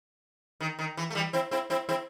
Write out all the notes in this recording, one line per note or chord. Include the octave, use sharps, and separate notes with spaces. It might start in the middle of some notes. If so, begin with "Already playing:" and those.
D#3
D#3
E3
A3
E3 G3
C4 E4
C4 E4
C4 E4
C4 E4